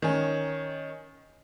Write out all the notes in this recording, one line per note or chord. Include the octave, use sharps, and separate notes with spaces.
D#3 C#4